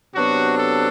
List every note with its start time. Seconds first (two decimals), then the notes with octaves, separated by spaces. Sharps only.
0.14 C3 F#3 B3 D4 F#4
0.58 A4